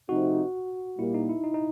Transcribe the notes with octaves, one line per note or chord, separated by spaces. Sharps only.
C3 F3 A3 C4 D#4 F#4
A#2 G3 A#3 E4
D#4
E4
D#4
D#4